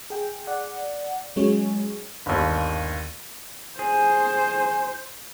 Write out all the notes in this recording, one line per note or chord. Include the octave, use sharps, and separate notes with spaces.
G#4 G5
D5 F#5
F#3 G#3 C#4 G#4 C#5
G1 D#2
G#4 C5